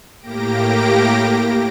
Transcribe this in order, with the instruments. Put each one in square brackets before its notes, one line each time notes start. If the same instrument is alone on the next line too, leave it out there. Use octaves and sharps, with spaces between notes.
[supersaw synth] A2 A#3 G4 A#6 D7